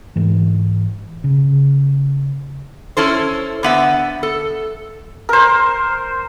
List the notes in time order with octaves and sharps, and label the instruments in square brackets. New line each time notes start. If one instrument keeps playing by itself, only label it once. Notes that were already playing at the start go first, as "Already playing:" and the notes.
[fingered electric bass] G#2 E3
C#3
[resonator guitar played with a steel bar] C#4 E4 A4 C5
D3 B3 E5
A4
[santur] A#4 C5